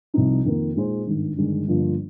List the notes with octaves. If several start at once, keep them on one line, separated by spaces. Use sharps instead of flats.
C2 C3 F3 C4 D#4
F2 D#3 A#3
A#2 G#3 D#4 G#4 C5
G#1 G2 D#3
G1 G2 D#3 G#3
G1 G2 F3 A#3 F4